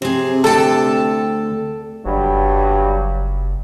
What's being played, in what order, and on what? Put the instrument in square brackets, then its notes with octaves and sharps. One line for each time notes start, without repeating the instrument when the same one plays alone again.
[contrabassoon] C3 [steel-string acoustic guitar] C4 G#4
[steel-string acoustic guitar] D2 G5 A5 [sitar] A4
[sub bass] F#1 [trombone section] G2 F#3 G3